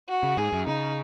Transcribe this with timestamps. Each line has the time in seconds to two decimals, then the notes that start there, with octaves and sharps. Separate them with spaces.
0.09 F#4
0.23 C#3
0.37 G#2 G#4
0.53 F#2
0.67 C#3 D#4